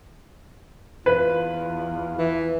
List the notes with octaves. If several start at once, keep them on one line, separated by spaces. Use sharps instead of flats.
E2 F4 B4
E3